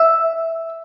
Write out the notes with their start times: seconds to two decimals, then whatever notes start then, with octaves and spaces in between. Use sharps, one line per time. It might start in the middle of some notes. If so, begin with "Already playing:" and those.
Already playing: E5